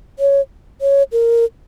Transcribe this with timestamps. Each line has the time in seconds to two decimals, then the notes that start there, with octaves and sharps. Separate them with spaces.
0.19 C#5
0.81 C#5
1.12 A#4